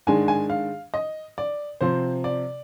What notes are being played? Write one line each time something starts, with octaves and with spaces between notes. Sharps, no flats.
G#2 D#3 G#3 D4 G#5
G#5
F5
D#5
D5
C3 F3 C4 C5
D5